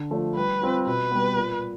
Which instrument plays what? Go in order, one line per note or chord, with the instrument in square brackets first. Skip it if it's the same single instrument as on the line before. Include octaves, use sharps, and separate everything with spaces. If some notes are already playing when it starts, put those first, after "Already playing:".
Already playing: [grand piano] D3
F3 A3 D4
[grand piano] G3 [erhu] B4
[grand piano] C4 F4
[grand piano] B2 [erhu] B4
[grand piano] G3 B3
A#2